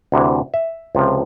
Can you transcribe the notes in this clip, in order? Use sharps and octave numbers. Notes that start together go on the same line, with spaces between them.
D2 C3 E3
E5
C#2 C3 F3